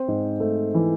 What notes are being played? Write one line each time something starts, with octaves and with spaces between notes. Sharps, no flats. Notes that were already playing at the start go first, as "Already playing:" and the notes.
Already playing: C4 C5
G#2
A3
E3